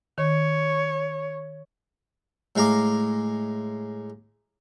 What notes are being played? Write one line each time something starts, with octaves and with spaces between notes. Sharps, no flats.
D#3 C#5
A2 G#3 F5 A#5 D6